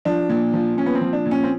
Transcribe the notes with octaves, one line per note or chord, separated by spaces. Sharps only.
F3 D4
A#2
F3
A#2 C#4
B3
C4
F3
D4
A#2
C#4
C4